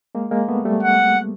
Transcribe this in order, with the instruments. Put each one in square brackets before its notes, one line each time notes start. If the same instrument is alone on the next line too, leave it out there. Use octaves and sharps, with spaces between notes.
[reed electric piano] G#3 A#3
G#3 A#3
A3 B3
G3 A3
[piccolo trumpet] F#5